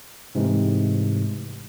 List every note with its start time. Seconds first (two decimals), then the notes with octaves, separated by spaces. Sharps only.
0.35 G#2 C3 E3 G#3 A3